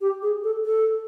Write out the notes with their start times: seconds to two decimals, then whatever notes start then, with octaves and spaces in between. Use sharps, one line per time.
0.01 G4
0.22 G#4
0.44 A4
0.65 A4